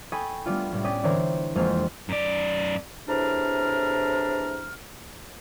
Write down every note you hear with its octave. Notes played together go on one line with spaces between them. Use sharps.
A4 G5 G#5 B5 C#6 D#6
G3 A3 B3 D4 F4
C2 A2 G3
C#4 D5 G5 D#6 B6
D3 E3 D4 A#4 C5 C#5
E1 F2 G#3 A#3 C5 C7
F#2 D5
E2 A2 C3 D4 A#5 F6